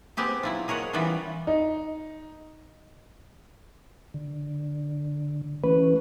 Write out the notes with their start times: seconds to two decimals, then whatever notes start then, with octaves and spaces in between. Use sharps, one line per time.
0.17 B3 C4 G4 G#4
0.43 F#3 E4 F4
0.68 G#4 A#4 C#5 D#5 F#5
0.93 E3 G3 B3 C#4 F4
1.47 D#4
4.14 D3
5.64 E3 A3 C#4 B4